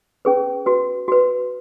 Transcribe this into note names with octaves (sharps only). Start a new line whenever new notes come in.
C#4 G#4 B4
F#4 B4
F#4 B4